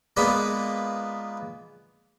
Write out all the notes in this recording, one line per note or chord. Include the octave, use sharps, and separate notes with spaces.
G#3 A#3 B3 F4 B4 D5